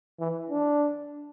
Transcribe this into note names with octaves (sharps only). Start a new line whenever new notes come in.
E3
D4